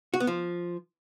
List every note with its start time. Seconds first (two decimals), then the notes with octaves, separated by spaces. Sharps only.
0.14 F#4
0.20 B3
0.27 F3